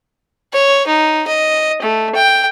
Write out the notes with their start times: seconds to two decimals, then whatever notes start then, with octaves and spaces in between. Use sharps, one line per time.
0.53 C#5
0.87 D#4
1.27 D#5
1.82 A3
2.15 G5